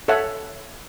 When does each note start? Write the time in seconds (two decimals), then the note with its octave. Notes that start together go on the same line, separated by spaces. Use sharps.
0.08 A4 C#5 E5 F#5